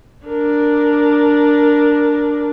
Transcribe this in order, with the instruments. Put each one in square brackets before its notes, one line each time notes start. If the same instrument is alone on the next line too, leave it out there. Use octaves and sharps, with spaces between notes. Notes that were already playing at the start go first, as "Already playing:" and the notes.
[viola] D4 A#4